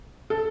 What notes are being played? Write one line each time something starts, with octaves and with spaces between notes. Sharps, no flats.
A4